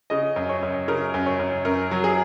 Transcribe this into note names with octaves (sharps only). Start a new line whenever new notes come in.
C#3 D#5
F#2
C#5
F#2
C#3 A#4
F#2
C#5
F#2
F#2 A#4
F#3
G#4